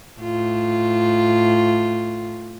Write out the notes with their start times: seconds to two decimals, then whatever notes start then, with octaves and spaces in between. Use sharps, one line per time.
0.20 A2 F4